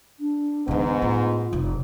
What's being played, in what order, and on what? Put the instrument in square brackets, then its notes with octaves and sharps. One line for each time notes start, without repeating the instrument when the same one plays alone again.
[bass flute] D4
[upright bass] E2 D3 [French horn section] G#2 B3
[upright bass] A2 [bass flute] F4
[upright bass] F1